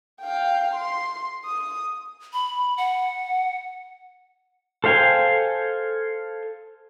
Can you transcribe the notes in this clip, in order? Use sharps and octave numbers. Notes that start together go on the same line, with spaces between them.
F5 G5
C6
D#6
B5
F#5
A4 C5 F5 G5 G#5